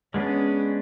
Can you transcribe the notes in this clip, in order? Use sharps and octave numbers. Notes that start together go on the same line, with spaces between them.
G#3 B3 C#4 D4 G#4